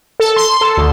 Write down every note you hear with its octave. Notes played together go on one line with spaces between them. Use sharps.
A4
C6
A4
D2